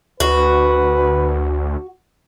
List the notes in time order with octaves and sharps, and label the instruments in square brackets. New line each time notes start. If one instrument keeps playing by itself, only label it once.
[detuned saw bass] D2 [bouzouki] F#4 [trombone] B4